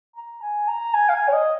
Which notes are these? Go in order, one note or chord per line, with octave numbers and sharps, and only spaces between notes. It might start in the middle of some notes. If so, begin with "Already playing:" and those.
A#5
G#5
A#5
G#5
F5
G#5
C#5
D#5